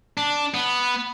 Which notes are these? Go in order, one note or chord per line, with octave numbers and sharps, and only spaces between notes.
D4
B3